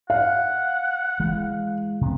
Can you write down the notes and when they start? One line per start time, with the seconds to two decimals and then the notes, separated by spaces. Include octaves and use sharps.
0.10 F5 F#5
1.20 E3 G#3
2.01 C3 B3